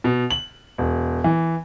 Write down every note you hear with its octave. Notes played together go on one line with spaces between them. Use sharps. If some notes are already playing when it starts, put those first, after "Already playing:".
B2
F#7
E1
E3